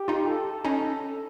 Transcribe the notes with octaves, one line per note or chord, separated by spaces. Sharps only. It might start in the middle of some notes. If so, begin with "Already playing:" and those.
Already playing: G4
D#4 F4
A4
C#4 D#4